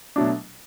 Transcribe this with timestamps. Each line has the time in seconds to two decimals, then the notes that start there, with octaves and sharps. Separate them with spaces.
0.16 B2 F#3 A3 D4